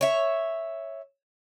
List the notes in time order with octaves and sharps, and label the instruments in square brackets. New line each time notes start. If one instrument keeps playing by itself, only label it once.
[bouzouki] C#5 E5